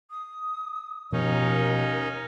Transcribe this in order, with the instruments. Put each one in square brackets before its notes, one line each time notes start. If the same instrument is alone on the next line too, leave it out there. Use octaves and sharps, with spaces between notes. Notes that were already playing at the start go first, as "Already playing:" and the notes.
[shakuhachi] D#6
[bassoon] D#2 [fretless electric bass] B2 F3 [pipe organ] C#4 D#4 [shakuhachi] A#4